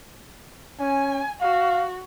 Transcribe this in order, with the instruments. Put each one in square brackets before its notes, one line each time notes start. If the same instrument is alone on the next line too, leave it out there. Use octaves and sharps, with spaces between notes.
[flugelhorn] C#4 [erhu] G#5
[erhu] F#4 [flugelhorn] F5